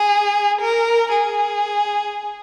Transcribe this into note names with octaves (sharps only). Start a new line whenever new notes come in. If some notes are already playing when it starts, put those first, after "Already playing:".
Already playing: G#4
A#4
G#4